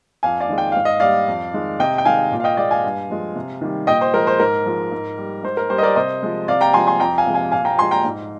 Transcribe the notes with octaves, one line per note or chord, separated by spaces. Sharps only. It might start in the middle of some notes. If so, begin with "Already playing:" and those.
F2 F5 G#5
D5 F5
D#3 G#3
G5
G#2 F5
D#5
G3 D5 F5
F2
D#3 G#3
C3 D#5 G5
G5
D#3 G#3 F5 G#5
A#2
F5
D#5 G5
G#3 D5 F5
F5 G#5
G2
F3 G#3
C3
D#3 G3
A#2 D#5 G5
C5
F3 G#3 A#4
C5
G#2 A#4
F3 G#3
G#2
G3
G#2 C5
A#4
G3 C5
D#5
A#4 D5
C3 C5 D#5
F3 G#3
C3 D5 F5
G5 A#5
F3 G#3 G#5 C6
G#5 C6
F2 G5 A#5
F5 G#5
C3 F3 G#3
F5 G#5
A#2 F5 G#5
G5 A#5
F3 G#3 G#5 C6
G5 A#5
G#2